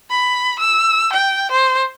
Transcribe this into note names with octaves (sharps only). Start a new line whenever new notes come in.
B5
E6
G5
C5